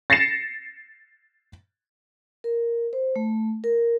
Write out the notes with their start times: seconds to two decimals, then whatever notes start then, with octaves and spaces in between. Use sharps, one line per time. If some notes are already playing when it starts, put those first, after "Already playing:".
0.10 A6 A#6 C7 C#7 E7
2.44 A#4
2.93 C5
3.16 A3
3.64 A#4